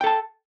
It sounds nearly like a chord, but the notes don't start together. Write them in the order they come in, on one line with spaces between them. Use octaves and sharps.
G5 A4 A5